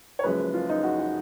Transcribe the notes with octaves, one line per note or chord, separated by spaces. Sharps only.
C#5
F#1 F#2 F3 G#3 B4
F4
D#4
F#4
F#4